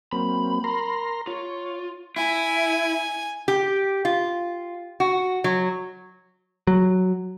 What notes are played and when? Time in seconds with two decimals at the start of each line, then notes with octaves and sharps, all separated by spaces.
0.13 F#3 A#3 C4 B5
0.64 A#4 A#5 C6
1.27 F4 C#5
2.16 E4 G#5
3.48 G4
4.05 F4
5.00 F#4
5.44 F#3
6.67 F#3